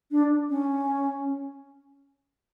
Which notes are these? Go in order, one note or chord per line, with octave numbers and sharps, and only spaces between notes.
D4
C#4